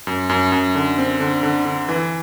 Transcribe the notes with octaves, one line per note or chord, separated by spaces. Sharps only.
F#2
F#2
F#2
D3
C4
D3
D3
D3
E3